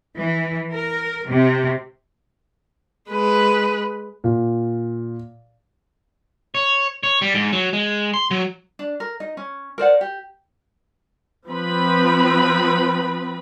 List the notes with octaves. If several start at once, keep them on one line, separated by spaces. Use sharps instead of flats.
E3
A#4
C3
G#3 B4
A#2
C#5
C#5
G3
G#2
F#3
G#3
C6
F#3
D4
A#4
D#4 D#5
C#4
A#4 C5 D5 F#5
G4
F3 C4 B4 B5